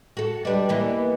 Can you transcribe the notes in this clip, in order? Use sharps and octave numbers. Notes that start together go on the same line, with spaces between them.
F#4 A4
G3 D4 B4 D#5
E3 A#3 B3